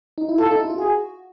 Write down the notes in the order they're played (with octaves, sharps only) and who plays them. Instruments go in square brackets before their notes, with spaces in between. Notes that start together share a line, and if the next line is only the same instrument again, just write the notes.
[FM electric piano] D#4
E4
[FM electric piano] F4 [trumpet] A4
[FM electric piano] D#4
E4
F4
[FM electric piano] F#4 [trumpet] G#4